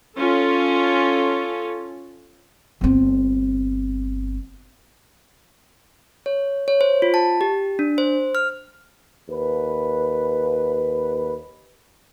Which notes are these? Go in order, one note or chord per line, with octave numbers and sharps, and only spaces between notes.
C#4 F4 A4
G1 C4
C#5
C#5
C5
F4
A5
G4
D4
C5
F6
D#2 B4